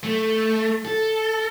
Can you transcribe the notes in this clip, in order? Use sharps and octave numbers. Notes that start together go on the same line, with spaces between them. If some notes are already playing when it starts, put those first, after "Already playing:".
A3
A4